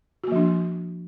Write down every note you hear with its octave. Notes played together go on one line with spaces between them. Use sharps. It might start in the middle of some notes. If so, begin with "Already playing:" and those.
F3 A#3 D4 F#4